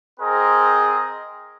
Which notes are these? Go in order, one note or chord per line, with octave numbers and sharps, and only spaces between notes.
C4 G#4 A#4 C5 D#5